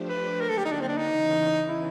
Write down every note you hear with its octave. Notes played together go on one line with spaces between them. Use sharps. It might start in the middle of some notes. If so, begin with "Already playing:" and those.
Already playing: F3 A3 D4 G4 C5
B4
D3 F#3 A#3 A#4
A4
G4
D#4
D4
C4
D4
D#4
E2 C#3 E3
E4